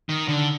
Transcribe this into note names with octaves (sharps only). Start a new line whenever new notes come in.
D#3
D3